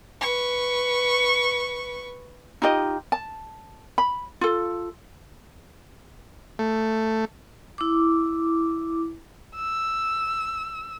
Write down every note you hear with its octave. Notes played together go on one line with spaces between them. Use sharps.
B4 C#6
D#4 F4 G4 D#5
A5
B5
F4 A4
A3
E4 D6
E6